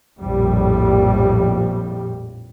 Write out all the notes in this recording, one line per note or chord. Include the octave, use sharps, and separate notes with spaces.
A#1 F2 A2 G3